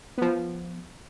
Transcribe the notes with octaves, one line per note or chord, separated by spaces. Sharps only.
F3 B3